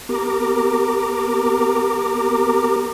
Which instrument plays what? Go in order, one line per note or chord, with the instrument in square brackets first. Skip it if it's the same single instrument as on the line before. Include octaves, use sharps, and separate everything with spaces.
[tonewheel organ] B3 G4 A#4 A#5 D6